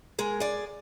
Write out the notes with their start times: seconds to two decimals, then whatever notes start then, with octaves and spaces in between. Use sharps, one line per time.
0.18 G#3 G#4 A#4
0.40 G#4 D5